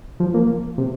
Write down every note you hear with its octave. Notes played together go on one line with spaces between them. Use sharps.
F3
A#3
C3